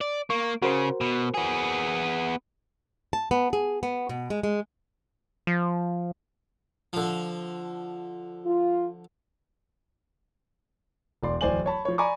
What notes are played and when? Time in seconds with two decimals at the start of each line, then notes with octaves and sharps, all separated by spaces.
0.01 D5
0.30 A#3 C#6
0.62 C#3 F#4 A#4 C5
1.01 B2
1.34 B3 G#4
3.13 A5
3.31 B3
3.53 G#4
3.83 B3
4.09 B2
4.30 G#3
4.43 G#3
5.47 F3
6.93 D3 F3
8.45 F4
11.23 E1 D5 C6
11.41 D1 E2 C5 D5 G#5 F#7
11.66 C#5 A5 B5
11.85 F3 C#5
11.98 D5 G#5 A#5 B5 C#6 D6